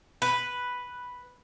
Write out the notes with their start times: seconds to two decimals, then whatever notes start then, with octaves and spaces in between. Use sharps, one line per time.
0.22 B4